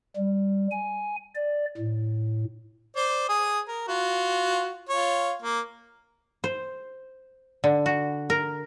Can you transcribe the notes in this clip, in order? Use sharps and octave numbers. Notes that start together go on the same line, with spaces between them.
G3
G#5
D5
A2
C5 D5
G#4 D#6
A#4
F4 F#4
F4 C#5
A#3
C5
D3
F#4
A#4